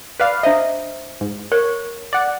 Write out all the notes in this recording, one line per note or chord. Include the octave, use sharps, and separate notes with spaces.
B4 D5 F5
D4 C5 D#5 E5
G#2
A#4 C#5
D5 F#5